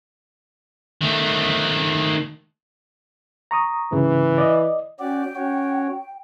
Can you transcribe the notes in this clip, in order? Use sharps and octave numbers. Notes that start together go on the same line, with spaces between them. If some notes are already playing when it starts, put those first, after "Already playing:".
D#3 A3
A#5 C#6 D#6
G#2 C#3 E3
D5 D#5
C#4 F#4 D5 G5
C#4 F#4 C#5